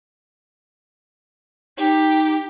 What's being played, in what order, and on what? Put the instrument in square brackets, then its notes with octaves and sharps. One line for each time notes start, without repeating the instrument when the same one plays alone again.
[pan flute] D#4 [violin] G4